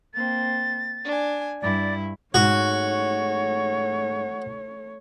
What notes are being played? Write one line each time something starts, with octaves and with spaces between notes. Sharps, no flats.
A#3 C4 A6
D4 G#5
G2 E4 D5
G#2 A3 F#4 C#5